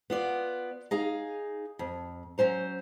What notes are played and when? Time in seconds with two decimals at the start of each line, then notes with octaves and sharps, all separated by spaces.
0.10 B3 F4 D5
0.91 D#4 G#4 F5
1.79 F2
2.38 F#3 C#4 C5 A#5